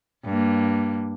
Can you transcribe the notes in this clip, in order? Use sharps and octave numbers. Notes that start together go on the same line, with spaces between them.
G2 A#3